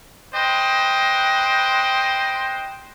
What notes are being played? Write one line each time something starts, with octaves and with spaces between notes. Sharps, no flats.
B4 C5 D#5 G5